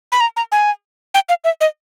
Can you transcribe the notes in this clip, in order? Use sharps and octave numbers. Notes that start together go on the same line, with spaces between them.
B5
A#5
A#5
G#5
G5
F5
E5
D#5